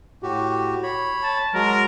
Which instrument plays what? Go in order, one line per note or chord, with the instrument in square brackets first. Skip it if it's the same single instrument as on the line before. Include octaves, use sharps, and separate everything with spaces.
[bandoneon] A2 F#4 G4
C#5 B5
[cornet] A5
[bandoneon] F#3 G#3 [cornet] A#4